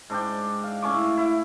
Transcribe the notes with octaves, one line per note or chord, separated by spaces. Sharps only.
G#2 D4 D5 G5
F5
A2 C#4 C#6 D6
E4